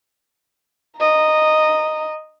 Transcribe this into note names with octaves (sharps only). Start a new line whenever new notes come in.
D#5 A#5